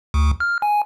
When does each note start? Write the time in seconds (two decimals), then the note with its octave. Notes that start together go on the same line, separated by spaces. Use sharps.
0.14 D2
0.40 F6
0.62 G#5